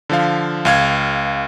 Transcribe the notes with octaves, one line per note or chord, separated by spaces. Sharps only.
D3 F3 F5
C#2 F5 G#6